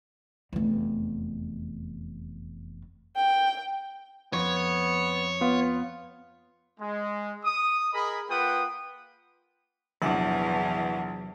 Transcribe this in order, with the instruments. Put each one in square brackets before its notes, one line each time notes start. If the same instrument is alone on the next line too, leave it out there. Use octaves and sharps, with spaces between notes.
[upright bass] F1 E2
[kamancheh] G5
[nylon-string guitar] F2 [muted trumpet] B3 [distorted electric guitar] C#5
[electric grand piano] B3 [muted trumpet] F4
[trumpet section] G#3
D#6
G#4 A#4 D#5 B5
A#3 F4 B4 F#5 G5 D#6
[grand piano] A#1 [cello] E2 E3 [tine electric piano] C3 F#3 [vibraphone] E5 F#5 A5